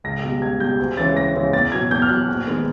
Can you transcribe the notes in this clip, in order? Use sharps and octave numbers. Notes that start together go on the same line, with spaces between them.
C#2 A#6
B2 G3
C#2 G#6
B2 G3 G6
D2
C#3 E3 G#3 C#4 A6
D2 A#6
C#3 E3 G#3 C#4
E2 A6
B2 F#3 G#6
E2 G6
F6
B2 F#3 F#6
A#1
D#3 G#3 B3